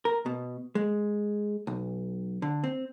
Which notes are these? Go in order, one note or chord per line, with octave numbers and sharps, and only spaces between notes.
A#4
B2
G#3
B1
D3
C4